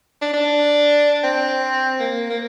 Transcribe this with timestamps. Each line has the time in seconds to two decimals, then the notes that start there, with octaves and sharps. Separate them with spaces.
0.22 D4
0.34 D4
1.24 C4
1.99 A#3
2.30 A#3